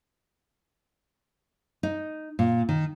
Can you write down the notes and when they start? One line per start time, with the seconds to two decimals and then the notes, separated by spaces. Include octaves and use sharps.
1.83 D#4
2.39 A#2
2.69 D#3